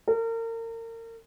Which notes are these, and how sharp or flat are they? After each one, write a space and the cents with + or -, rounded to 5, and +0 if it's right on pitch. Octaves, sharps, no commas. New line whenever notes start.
A#4 -35